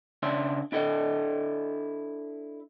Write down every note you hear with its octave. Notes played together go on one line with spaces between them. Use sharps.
C#3 D4 D5 E5 C6
D4 E4 A4 D#5